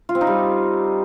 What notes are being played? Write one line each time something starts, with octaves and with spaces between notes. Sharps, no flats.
F4
C4
D#4
G3